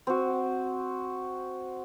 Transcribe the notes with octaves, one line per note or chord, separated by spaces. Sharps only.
C4 F#4